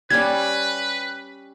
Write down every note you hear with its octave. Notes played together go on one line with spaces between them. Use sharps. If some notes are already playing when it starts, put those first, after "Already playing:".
G3 C#4 B4 D5 G#6